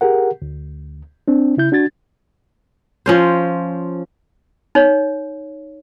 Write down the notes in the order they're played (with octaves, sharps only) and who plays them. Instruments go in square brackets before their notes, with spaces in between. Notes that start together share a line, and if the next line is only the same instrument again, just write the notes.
[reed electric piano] G4 G#4 A#4 F#5
D2
C4 D4
C#3 E4 G6
D4 F#4 G#6 A6
[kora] F3 C#4 C5
[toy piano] D#4 C#5